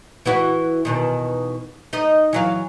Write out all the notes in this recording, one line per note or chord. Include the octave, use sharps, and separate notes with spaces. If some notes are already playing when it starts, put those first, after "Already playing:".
E3 E4 F#4
E2 B2 D#3
D#4 D#5
E3 F#3 F5